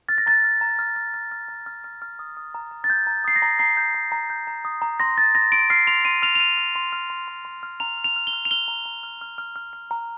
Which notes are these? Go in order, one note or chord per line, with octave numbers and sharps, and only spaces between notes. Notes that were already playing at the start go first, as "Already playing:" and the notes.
F6 A6
A#6
A#5 A6
F6
A#5
F6
F6
F6
F6
A#5
F6
F6
F6
D#6
D#6
A#5
A#5
A6
G6
A#5
D#6 C7
A#6
A#5
A#5 C7
G6
A#5
A#5
G6
A#5
D#6
A#5
C6 A#6
C6 A6
C6 A#6
C6 D7
F6 C7
C6 F7
C6 D#7
F6 F7
F7
F6 D#7
F6
C6
F6
C6
C6
C6
F6
A#5 F7
F6
F7
F6
G7
F6
F7
F6 G7
A#5
A#5
F6
F6
F6
F6
F6
A#5